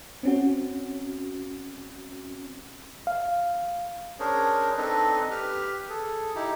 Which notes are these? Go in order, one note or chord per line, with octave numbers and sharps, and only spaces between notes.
C4 C#4 F#4
F5
C#4 D4 G#4 A#4 C5 C#5
C4 D4 D#4 A4 B4 D#5
G4 B4 F6
G#4 A4
D#4 E4 G4